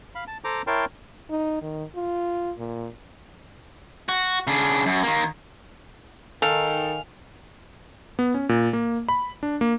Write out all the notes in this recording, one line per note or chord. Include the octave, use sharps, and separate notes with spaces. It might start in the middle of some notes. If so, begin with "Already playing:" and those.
F5 B5
A5
A4 C5 A#5 D6
E4 A#4 C#5 G5 A5 C6
D#4
D#3
F4
A#2
F#4
C#3 D4
F#2
D#3 A#3
D#3 A4 F5 G#5 F7
B3
C#4
A#2
A#3
B5
D4
A#3